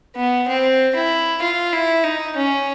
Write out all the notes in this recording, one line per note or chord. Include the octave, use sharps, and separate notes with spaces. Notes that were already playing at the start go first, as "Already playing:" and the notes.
B3
C4
E4
F4
E4
D#4
C#4